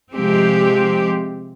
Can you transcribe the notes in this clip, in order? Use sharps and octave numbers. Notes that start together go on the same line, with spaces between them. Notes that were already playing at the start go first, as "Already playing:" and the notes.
C3 F3 G#3 C4 G4